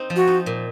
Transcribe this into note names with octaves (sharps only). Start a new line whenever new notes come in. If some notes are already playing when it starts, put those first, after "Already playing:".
Already playing: C4 D#4
F3
F#4
D#4
A#2